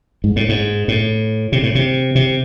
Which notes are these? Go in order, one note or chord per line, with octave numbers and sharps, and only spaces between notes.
G#2
A2
G#2
A2
C3
A2
C3
C3